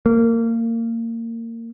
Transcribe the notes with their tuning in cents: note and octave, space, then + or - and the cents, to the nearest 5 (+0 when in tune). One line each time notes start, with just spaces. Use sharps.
A#3 -25